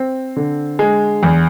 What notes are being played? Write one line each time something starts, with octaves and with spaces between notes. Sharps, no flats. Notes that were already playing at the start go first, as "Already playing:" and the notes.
Already playing: C4
D3
G#3
E2